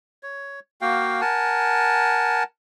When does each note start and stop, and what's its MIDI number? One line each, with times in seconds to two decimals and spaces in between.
0.23 0.60 73
0.81 1.21 58
0.81 1.21 66
0.81 1.21 77
0.81 1.21 79
1.21 2.43 70
1.21 2.43 78
1.21 2.43 80
1.21 2.43 81